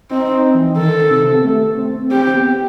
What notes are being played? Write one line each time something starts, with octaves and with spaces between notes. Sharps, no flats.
C4 D#4
D#4
E3
D#3 A4
C3
B3
A3
C4
C4 G4
B3